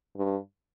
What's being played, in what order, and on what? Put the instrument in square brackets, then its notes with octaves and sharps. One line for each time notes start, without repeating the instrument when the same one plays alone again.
[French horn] G2